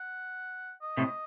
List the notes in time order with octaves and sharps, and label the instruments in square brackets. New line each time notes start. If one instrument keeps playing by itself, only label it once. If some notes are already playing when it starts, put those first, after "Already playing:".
Already playing: [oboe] F#5
D#5
[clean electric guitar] A2 C3